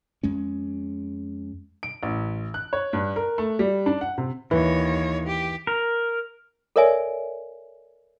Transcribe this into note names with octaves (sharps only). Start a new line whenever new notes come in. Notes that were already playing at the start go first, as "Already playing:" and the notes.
F2 G#3 C#4
D7
A1
F#6
C#5
G2
A#4
A3
G3
D4
F#5
C3
D#2 E3 C#5
G4
A#4
A4 A#4 C#5 D5 E5 G#5